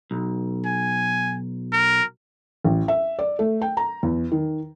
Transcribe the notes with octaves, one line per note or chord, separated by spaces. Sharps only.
B1
G#5
A#4
A1
E5
D5
A3
G5
A#5
E2
D#3